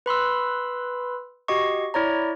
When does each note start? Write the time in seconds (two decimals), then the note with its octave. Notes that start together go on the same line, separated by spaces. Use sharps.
0.06 B4 B5 C6 E6
1.48 F#4 G4 D#5 C#6
1.94 E4 C#5 D5 A#5